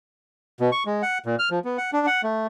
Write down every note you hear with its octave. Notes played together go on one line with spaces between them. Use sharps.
B2
C#6
G#3
F#5
A#2
F6
F3
B3
F#5
D4
F#5
A3